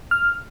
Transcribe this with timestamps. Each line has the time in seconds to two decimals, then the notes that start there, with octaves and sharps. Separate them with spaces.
0.11 F6